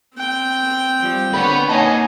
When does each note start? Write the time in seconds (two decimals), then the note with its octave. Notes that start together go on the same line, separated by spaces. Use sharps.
0.15 C4 G5
1.00 F3 G3
1.34 D3 B4 C#5 F#5 B5
1.69 A#3 D#4 C#5 D#5 F#5 G#5 A5